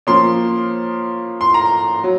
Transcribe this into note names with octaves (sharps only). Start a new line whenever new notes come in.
F3 A#3 C#4 C6
C6
A#5
F#3